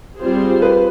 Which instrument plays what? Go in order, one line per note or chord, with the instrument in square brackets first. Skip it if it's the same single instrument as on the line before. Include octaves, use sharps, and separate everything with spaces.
[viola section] G3 C4 F4 G#4 C5
[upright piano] B4